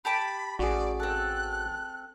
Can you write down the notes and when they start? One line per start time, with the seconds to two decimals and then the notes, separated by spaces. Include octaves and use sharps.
0.05 G4 A5 B5 D6
0.59 A1 F#4 G#4 D5
1.00 C4 A4 F#6